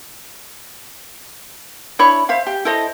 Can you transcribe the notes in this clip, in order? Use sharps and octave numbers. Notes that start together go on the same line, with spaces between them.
D4 E4 C#5 B5
C5 E5 F5
G4
E4 A4 C5 D#5